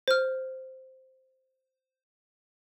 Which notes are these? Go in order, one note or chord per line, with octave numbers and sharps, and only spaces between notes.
C5 F6